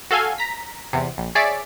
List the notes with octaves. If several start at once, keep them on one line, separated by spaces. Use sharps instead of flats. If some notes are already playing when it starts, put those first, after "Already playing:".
F#4 A4 F5 G#5
A#5 B6
E2 C3
A#1
G#4 C#5 D5 E5